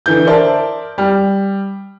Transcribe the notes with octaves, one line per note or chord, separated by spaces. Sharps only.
D3 E3 G6
A#4 C5 D5 E5 A5
G3